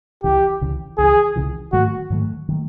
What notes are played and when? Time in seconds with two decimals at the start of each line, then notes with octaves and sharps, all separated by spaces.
0.23 C#2 C#3 E3 G4
0.61 C#2 C#3 E3
0.98 C#2 C#3 E3 G#4
1.36 C#2 C#3 E3
1.72 G#2 D#3 F#3 A3 F#4
2.10 G#2 D#3 F#3 A3
2.49 D#3 F#3 A3